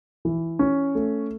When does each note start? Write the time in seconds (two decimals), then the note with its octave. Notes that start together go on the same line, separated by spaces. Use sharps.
0.25 E3
0.59 C#4
0.95 A3